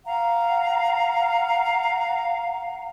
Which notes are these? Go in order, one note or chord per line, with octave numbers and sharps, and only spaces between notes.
F5 F#5 A#5